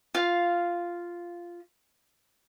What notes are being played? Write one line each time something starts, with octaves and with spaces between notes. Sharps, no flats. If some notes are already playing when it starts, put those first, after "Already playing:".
F4 F5